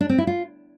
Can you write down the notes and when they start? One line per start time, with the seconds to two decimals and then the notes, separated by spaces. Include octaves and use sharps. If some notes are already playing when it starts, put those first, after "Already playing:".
0.01 D4
0.09 C4
0.18 E4
0.27 F4